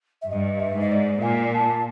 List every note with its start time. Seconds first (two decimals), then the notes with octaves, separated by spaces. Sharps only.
0.22 E5
0.30 G2 D#5
0.60 E5
0.76 G#2 D#5
0.92 D5
1.22 A#2 G#5
1.54 A5